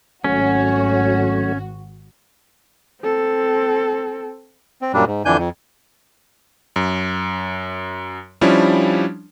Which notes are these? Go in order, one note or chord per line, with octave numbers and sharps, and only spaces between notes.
G#1 F#3 A3 C#4 F#4 C#5
C4 A4
C4
F#2 A#2 G3 D4
G#2
F2 D3 E3 D4 G#5 G6
F2
F#2
F3 G3 C#4 D4 E4